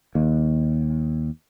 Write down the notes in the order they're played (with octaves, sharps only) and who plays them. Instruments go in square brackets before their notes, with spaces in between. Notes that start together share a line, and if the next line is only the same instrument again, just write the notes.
[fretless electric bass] D#2